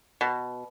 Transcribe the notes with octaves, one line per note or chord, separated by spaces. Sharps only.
B2